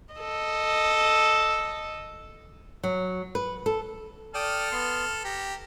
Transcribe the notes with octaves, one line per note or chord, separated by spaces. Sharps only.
A4 D#5
F#3
B4
A4
A4 D5 G5 D#6 F6
B3 C6
G4 A#5